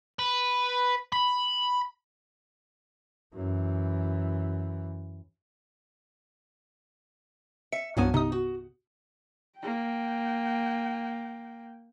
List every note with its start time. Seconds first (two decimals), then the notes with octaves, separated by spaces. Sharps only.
0.19 B4
1.13 B5
3.34 F#2 E3
7.72 E5 C#7
7.97 C2 G2 F3 F#3 B3 G#5
8.14 C3 D#4 D#6
8.32 F#4
9.59 A#3 G5